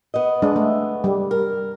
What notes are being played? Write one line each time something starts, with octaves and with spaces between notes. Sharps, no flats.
B3 D#5
G#3 D4
A3
G3
A#4